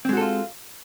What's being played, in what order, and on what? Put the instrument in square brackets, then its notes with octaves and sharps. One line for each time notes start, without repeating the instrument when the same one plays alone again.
[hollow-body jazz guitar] C4
G#3
F#4
A4
F4